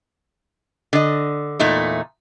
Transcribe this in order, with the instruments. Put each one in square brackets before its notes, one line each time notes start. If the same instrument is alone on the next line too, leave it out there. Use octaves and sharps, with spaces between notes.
[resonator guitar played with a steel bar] D3 D#5
E2 A#2 A3 D#4